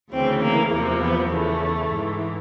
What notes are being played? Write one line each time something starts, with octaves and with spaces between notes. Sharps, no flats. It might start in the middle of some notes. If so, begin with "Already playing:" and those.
D2 C#3 E3 C4
A#3
E2 C3 F3 A#3
B3
E2 C#3 E3 A3
G#2 E3